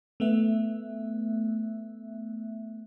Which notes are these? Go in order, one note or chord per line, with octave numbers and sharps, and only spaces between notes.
A3 B3 E5